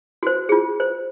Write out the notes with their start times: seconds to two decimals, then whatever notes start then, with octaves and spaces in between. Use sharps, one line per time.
0.23 F#4 C5
0.49 F4 G#4
0.80 C5